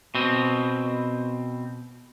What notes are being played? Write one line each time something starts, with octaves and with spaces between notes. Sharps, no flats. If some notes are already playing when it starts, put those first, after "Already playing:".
B2 C4